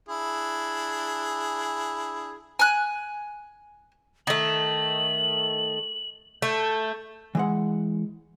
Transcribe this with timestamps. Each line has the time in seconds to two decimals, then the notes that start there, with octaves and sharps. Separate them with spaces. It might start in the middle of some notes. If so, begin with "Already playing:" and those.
0.09 D4 E4 G#4
2.59 G#5 F#6
4.27 D#3 A3 F#7
6.42 A3 G6
7.35 E3 G#3 F#5